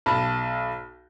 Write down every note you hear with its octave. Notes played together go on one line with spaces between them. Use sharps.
B1 A5 B5